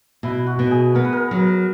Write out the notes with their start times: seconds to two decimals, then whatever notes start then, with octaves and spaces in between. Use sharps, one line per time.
0.23 B2 E4
0.47 F#4
0.59 B2
0.71 G#4
0.95 B3 A#4
1.04 B4
1.13 A#4
1.31 F#3